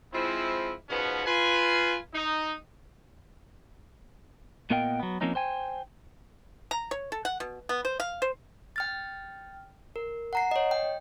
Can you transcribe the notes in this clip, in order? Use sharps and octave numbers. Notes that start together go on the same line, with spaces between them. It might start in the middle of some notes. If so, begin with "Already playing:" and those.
F3 G#3 C4 E4
G#2 B2 F3 B3 C#4 F#4
F4 B4 G#5
D#4
A#2 B3 A#4 D#5 F5 G5
F#3 B3
F3 A#3 C4 C#4 D#4
C5 G5 G#5
A#5
C#5
A4
F#5
B2
B3
C5
F5
C5
G5 F6 A6
A#4
F#5 A#5 C7
C#5 D#5
G5